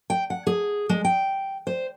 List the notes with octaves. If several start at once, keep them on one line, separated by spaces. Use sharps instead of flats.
G5
F#5
G#4
G#3
G5
C5